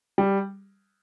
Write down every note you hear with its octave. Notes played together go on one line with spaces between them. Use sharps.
G3